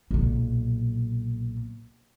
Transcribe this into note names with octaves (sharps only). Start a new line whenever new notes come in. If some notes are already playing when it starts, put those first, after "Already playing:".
B1 A#2